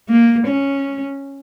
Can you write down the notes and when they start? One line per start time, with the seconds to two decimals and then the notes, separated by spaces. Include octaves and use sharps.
0.09 A#3
0.47 C#4